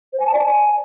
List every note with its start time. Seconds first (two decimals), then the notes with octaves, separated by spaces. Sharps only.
0.13 C5
0.20 G#5
0.27 A5
0.33 D5
0.40 G#5